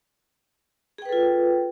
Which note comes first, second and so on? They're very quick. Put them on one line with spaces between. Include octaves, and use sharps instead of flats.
G#4 G5 B4 A4 F4